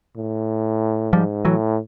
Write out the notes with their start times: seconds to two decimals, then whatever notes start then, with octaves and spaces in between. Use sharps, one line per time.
0.16 A2
1.13 G#2 F3 G3
1.45 A2 E3 F#3